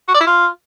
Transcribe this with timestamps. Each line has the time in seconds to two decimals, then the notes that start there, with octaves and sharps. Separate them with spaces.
0.08 F#4
0.14 D5
0.21 E4
0.27 F4